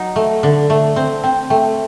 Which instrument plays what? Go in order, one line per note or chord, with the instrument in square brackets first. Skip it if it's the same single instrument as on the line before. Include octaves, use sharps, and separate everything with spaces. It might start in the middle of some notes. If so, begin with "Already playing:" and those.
Already playing: [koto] F#3 D#4 [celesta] F#5
[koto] A3
D3
A3
C4
[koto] C4 [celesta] G5
[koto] A3 [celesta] G5